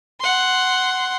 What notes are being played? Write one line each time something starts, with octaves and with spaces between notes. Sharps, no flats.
F#5 C6